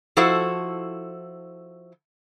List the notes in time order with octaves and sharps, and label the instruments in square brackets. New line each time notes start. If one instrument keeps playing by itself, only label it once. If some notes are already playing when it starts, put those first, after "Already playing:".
[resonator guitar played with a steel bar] F3 E4 F#4 A4 C5